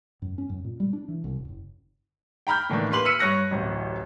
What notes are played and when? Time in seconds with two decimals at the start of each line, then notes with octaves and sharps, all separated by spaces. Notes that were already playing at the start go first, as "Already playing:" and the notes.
0.22 F#2
0.38 C#4
0.49 F#2
0.64 A#2
0.80 G3
0.93 D4
1.08 E3
1.24 C2
1.36 D#1
1.49 F#1
2.47 G5 A#5 B5 F6 G6
2.70 A2 D#3 E3 A#3 D4
2.91 A#3 G4 B4 C6 F#7
3.05 E6 F6 B6 C#7 D#7
3.19 G2 C#5 F#6 A#6 C#7
3.51 D1 A1 C5